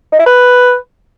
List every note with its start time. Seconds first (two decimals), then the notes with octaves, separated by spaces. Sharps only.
0.13 D#4
0.19 E4
0.26 B4